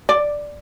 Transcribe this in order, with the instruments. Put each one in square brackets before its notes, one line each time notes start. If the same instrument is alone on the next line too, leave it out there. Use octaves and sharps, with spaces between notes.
[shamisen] D5